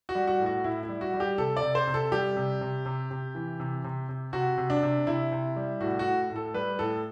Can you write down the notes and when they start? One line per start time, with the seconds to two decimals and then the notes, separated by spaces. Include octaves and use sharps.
0.09 F#4
0.15 G3
0.27 F#4
0.40 A2
0.46 F#4
0.64 A2 E4
0.83 E4
0.89 G3
1.01 F#4
1.14 G3
1.20 G4
1.38 C3 A4
1.57 D5
1.63 C3
1.75 C5
1.87 C3
1.94 A4
2.12 G3 G4
2.36 C3
2.61 C3
2.86 C3
3.11 C3
3.35 E3
3.60 C3
3.84 C3
4.09 C3
4.33 C3 F#4
4.58 C3
4.70 D4
4.83 C3
5.06 C3 E4
5.32 C3
5.56 G3
5.80 A2 F#4
5.99 F#4
6.05 A2
6.30 A2
6.36 A4
6.54 G3 B4
6.79 A2 A4